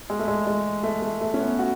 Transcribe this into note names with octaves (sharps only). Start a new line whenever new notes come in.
G#3
A3
G#3
G#3
A3
A3
A3
C#4
B3
F#4